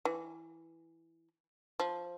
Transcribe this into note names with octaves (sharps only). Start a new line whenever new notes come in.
E3
F3